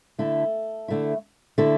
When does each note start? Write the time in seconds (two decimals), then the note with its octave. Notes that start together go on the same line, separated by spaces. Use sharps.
0.19 D3 A3 E4 A4
0.88 D3 A3 E4
1.58 D3 A3 E4 A4